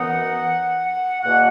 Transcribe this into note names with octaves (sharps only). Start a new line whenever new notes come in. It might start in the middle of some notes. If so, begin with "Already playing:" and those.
Already playing: F#2 E3 B3 D#4 F#5
E2 B2 A#3 F#5